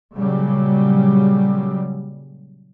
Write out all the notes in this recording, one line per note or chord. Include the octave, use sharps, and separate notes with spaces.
A#2 C#3 F#3 G3